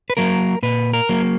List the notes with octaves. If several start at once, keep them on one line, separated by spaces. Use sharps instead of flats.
B4
F#3 A#3 A#4
A#2 B4
A#4
F#3 A#3